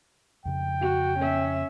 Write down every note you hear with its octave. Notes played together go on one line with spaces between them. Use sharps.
F2 C#3 G5
F#4
C#4 E5